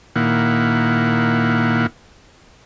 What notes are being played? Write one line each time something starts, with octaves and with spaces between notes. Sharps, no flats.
A#2 D#3 A#3 E4 F#5